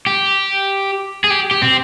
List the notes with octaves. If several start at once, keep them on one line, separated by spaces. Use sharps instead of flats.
G4
G#4
G4
G4
C4